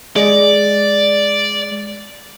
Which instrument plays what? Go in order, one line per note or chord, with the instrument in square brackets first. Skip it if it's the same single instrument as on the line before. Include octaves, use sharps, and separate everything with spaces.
[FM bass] G#3 [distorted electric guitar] D5